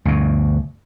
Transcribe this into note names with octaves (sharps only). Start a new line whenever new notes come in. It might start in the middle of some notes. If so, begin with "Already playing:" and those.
D2 G2 B2